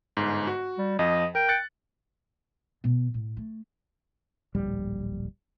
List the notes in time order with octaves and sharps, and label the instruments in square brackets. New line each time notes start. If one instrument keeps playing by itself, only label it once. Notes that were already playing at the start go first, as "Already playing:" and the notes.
[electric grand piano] G1 G#2
F#4
[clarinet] G3
[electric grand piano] F2 F3 [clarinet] D#5
[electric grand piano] A#4 [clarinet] G5
[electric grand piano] F#6 A6 C#7
[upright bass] B2
A2
A3
[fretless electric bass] D1 A#1 G3